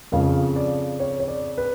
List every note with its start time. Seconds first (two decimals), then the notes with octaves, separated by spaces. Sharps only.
0.12 F2 C#3 F3 F5
0.56 D5
1.00 C#5
1.20 C#5
1.28 D5
1.58 B4